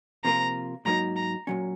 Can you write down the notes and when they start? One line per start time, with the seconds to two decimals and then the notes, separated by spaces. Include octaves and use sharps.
0.25 C3 F3 A#3 F4 A#4 A#5
0.85 G#2 F#3 A#3 D#4 A#5
1.16 A#5
1.47 A#2 F#3 C#4